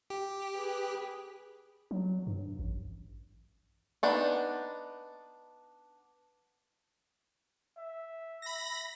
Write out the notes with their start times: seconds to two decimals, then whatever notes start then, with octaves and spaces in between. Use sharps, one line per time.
0.10 G4
0.56 G#4 B4
1.91 F#3
2.27 G2
2.59 A1
4.03 B3 D4 D#4
7.78 E5
8.42 B5 A#6